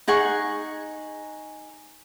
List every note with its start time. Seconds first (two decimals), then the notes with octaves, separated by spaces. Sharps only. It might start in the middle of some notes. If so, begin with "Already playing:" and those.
0.08 D#4 G#4 F#5 C#6